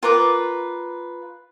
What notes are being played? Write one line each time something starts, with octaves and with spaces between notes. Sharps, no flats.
F4 A#4 B4 D6